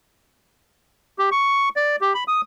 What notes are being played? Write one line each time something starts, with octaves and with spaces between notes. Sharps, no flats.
G4
C#6
D5
G4
B5
D#6